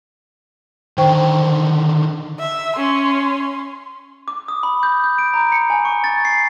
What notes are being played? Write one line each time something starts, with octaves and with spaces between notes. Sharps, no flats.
D3 D#3 C5 G5 C#6
E5
C#4 C6
D6
D#6
B5
G6
G6
D7
A#5
C#7
G#5
C#6
A6
C7